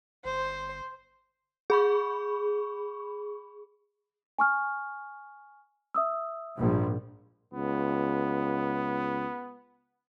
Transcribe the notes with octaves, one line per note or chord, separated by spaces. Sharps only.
G1 C5
G#4 B5 C#6
G#5 C#6 F6
E5 D#6 E6
A#1 G#2 G3
C#2 B3